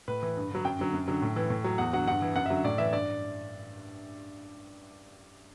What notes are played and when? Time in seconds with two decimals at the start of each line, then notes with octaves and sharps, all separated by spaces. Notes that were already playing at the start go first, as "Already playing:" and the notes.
0.08 A2 B4
0.23 E3
0.37 G2
0.51 D3 F#3
0.65 F#2 G5
0.79 D3 F#3
0.93 F#2
1.08 D3 F#3
1.22 A2
1.36 E3
1.50 A2
1.64 F#3
1.78 E2 F#5
1.93 D3 F#3 F#5
2.07 G2 F#5
2.22 E3
2.35 F#2 F#5
2.46 E5
2.50 D3 F#3
2.64 A2 D5
2.78 E3 E5
2.92 G2 D5